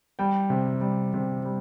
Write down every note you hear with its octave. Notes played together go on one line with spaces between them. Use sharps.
G3 G5
C3
G3
C3
G3